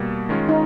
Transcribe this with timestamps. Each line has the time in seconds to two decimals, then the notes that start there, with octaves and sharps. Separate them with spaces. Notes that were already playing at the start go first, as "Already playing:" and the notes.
Already playing: B2 G3 A#3
0.29 D#3 G#3 C#4 F4
0.49 D#4